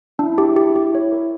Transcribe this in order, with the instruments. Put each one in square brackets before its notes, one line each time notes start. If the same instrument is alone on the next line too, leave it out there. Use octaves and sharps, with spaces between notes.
[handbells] D4 [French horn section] E4
[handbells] G4
G4
G4
C#5
A#4